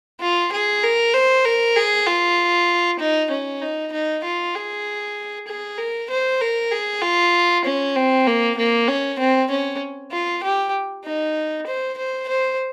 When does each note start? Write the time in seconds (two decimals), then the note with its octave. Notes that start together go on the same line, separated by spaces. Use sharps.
0.21 F4
0.52 G#4
0.83 A#4
1.14 C5
1.45 A#4
1.76 G#4
2.07 F4
2.99 D#4
3.31 C#4
3.62 D#4
3.92 D#4
4.24 F4
4.55 G#4
5.47 G#4
5.78 A#4
6.10 C5
6.41 A#4
6.72 G#4
7.02 F4
7.65 C#4
7.96 C4
8.27 A#3
8.58 A#3
8.88 C#4
9.19 C4
9.51 C#4
10.12 F4
10.44 G4
11.05 D#4
11.66 C5
11.97 C5
12.29 C5